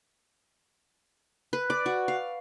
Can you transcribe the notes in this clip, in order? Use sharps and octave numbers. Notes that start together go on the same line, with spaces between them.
B4
D5
F#4
F5